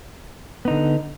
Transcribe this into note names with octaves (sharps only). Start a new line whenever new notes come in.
D3 B3 D#4